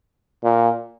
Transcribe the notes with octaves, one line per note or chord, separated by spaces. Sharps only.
A#2